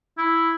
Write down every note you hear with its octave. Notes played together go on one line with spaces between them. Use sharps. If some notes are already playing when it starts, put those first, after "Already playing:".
E4